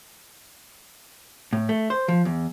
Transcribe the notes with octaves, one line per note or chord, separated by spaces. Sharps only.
A2
A3
C5
F3
E2